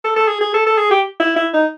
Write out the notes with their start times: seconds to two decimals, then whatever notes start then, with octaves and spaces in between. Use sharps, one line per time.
0.04 A4
0.16 A4
0.28 G#4
0.41 G#4
0.54 A4
0.66 A4
0.78 G#4
0.91 G4
1.20 E4
1.36 E4
1.53 D#4